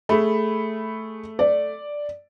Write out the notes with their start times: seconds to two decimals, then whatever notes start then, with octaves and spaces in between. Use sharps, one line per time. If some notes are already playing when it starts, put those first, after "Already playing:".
0.09 A3 G#4 B5
1.39 D5